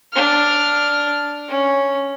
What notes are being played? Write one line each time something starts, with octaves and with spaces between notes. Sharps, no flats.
D4 F6
C#4